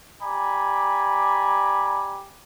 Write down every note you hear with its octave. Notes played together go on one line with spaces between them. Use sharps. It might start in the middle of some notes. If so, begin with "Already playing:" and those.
G4 D5 G#5 A#5 B5